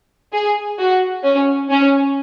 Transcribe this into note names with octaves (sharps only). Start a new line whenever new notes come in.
G#4
F#4
C#4
C#4